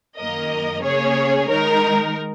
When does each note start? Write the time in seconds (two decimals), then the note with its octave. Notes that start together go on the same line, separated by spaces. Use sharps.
0.18 F#2 D#3 A#3 A#4 D#5
0.83 C#3 A#3 C#4 G#4 C#5
1.48 D#3 G#3 D#4 A#4